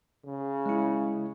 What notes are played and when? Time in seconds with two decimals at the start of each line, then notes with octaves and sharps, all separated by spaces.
0.25 C#3
0.66 G#3 E4